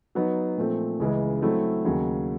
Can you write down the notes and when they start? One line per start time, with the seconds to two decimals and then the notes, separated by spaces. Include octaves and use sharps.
0.15 F#3 B3 D#4
0.57 A#2 F3 A3 C4
1.00 C#2 C#3 E3 G#3
1.42 F#3 A3 C4 E4
1.85 D#2 C#3 F#3